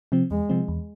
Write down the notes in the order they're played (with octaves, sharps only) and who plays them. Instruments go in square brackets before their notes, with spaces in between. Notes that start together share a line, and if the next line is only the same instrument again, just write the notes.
[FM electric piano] C3 F3 C4
[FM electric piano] E2 [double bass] G#3
[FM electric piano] C3 F3 C4
E2